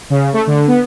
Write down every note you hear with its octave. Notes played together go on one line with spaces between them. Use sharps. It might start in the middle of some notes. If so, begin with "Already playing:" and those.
C#3
A3
D3
B3